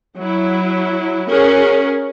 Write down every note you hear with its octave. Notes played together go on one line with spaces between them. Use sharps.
F#3 E4
C#4 F#4 G#4 A#4